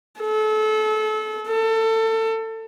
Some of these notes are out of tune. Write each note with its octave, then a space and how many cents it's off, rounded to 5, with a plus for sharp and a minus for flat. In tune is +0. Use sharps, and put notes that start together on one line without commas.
A4 -30
A4 +25